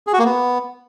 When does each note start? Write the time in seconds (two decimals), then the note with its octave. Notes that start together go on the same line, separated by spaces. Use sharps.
0.07 G#4
0.13 F#4
0.19 A#3
0.25 B3